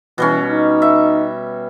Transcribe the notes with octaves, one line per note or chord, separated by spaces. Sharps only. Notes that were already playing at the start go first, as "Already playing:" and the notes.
B2 E3 G3 C#4
D#4
E5